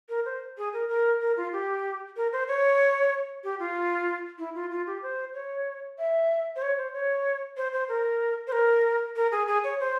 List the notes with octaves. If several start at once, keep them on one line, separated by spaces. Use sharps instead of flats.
A#4
C5
G#4
A#4
A#4
A#4
F4
G4
A#4
C5
C#5
G4
F4
E4
F4
F4
G4
C5
C#5
E5
C5
C#5
C5
C#5
C5
C5
A#4
C5
A#4
A#4
G#4
G#4
C#5
C5